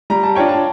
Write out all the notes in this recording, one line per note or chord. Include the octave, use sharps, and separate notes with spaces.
G3 A#5
A5
D4 F4 C#5 G5
A5